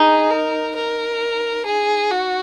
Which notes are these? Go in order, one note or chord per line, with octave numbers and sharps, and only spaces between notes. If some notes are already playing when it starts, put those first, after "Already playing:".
Already playing: D#4 G#4
A#4
A#4
G#4
F#4